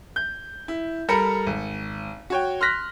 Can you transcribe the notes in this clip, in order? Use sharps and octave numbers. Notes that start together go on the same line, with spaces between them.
G6
E4
G3 A4 A#4 A#5 B5 C#7
G#1
F#4 C#5 G5
C6 F6 F#6 A#6 B6